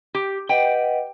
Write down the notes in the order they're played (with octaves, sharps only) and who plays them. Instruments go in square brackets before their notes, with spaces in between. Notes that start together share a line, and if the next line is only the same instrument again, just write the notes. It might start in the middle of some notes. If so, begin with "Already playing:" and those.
[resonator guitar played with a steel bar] G4
[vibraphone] B4 D#5 F#5 [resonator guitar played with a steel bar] G5